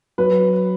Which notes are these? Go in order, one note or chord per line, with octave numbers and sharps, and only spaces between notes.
F#3 B4